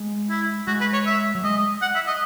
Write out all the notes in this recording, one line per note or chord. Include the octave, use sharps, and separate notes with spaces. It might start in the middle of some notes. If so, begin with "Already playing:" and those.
Already playing: G#3
E4
G#3 F#4
B4
C#5
E5
F#3
G#3 D#5
F#5
E5
D#5